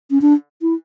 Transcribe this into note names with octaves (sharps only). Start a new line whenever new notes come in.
C#4
D4
E4